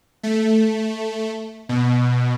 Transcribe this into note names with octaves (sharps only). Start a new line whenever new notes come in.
A3
B2